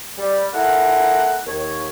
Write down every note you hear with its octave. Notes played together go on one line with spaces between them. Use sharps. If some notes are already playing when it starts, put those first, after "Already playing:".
G3
A#3 D#4 E4 A4 A#4 F#5
D#2 C#5